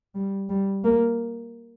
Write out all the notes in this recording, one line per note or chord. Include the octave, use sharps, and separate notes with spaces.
G3
G3
A#3